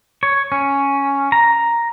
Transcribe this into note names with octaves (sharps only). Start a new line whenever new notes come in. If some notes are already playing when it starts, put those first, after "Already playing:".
C#5
C#4
A#5